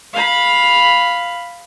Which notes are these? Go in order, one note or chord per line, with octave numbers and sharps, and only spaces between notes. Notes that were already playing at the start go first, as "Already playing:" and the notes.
F5 B5